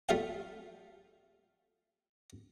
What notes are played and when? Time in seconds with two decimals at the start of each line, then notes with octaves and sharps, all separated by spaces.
0.09 G3 A3 F4 E5 F5 G5